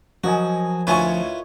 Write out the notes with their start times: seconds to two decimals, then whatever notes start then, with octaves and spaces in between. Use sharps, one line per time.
0.24 F3 F#3 F#4 A#4 D#5 G#5
0.87 D2 E4 F4 B4 C#5 G#5 C#6